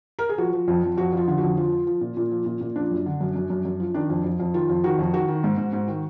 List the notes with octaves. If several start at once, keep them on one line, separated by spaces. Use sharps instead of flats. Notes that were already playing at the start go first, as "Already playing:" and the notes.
A#4
G#4
F3 F#4
F3
F2
F2
F2 F#4
F2 F4
D3 F4
F2 F#4
F3 F4
F3
F3
A#2
A#2
F3
A#2
A#2
F3 D4
F#2
D3
F#2
F#2
F#2
F#2
F3
D#3 D4
F2
F2
F2
D#3 F4
F2
D#3 F#4
F2
D#3 F#4
D#3
G#2
G#2
G#2
D#3